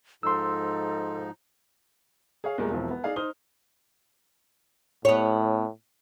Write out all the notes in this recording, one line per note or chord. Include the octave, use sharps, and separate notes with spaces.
G#2 F3 D#4 A4 C6 E6
G#4 C#5 F5
E2 A#2 G3 G#3 A#4
E1 B1 E3 F3 C4
B3
D#4 G#4 D5 F5 G#5
D#4 C5 D#6 F6 G7
A2 B3 C#5